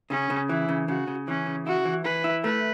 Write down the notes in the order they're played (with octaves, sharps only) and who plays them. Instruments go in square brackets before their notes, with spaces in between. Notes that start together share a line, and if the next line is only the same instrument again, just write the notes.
[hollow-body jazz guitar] C#3 [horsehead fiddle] C#4
[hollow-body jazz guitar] C#3
[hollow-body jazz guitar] E3 [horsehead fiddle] E4
[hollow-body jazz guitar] C#3
[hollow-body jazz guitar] C#3 [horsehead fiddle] F#4
[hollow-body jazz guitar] C#3
[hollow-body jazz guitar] E3 [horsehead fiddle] C#4
[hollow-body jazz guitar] C#3
[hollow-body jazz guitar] E4 [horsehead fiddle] F#4
[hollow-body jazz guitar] E3
[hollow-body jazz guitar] E3 [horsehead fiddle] B4
[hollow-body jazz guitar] E4
[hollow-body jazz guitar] A3 [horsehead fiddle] B4